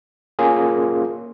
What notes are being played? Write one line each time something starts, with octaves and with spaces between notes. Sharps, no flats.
A#3 C#4 F4 G#4